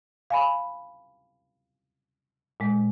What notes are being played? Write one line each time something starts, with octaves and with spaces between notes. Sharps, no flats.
F5 G#5 B5
A#2 G#3